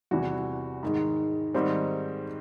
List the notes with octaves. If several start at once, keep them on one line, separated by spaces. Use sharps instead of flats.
E2 C3 E3 G3 F#4
G#2 D#3 G#3
G#2 D#3 G3 C4